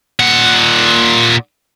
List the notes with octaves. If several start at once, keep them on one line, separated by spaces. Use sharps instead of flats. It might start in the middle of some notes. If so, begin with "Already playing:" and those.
A#2 F#5